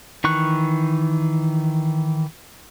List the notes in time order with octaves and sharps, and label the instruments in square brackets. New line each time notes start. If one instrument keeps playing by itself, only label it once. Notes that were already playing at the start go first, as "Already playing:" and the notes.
[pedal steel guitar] D#3 E3 C#6 F#6